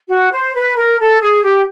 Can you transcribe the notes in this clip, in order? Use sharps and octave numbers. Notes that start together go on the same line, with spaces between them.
F#4
C5
B4
A#4
A4
G#4
G4